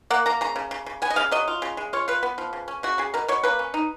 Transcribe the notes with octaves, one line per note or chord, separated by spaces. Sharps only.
A#3 F#5
A#3 A#5
C#3 A#5
C#3
C#3
C#3
B3 G#5
D#5
C#3 F5
F#3 D#5
F4
C#3
G#3
F4 C#5
F4 B4
B3
F3
C#3
C#4
C#3 F#4
C#3 G#4
B2 A#4
B2 C#5
A#3 B4
C#4
D#4